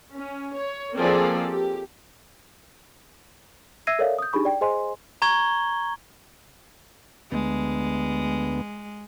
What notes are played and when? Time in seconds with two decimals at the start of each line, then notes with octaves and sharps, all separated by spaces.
0.14 C#4
0.54 C#5
0.94 F3 A#3 C4 G#4 A4 D5
1.48 G4
3.87 E5 E6 G#6 A#6 C7 D#7
3.99 A4 A#4 C#5 D5 E5 F5
4.19 D#6 G6
4.33 D4 D#4 G4 G#4 B5 C#6
4.45 D5 G5
4.61 G#4 C5 D#5 G#5 C6
5.22 A#5 C#6 G#6 G7
7.32 D2 G#3 B3